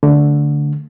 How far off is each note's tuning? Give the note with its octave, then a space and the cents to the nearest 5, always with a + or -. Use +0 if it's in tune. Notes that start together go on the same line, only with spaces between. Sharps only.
D3 -10 A3 +0